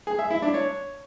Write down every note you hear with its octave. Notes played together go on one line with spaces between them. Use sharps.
G#4
E5
E4
D4
C#5